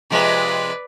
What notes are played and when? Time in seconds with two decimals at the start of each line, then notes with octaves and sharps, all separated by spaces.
0.10 C3 F3 G#3 B4 D5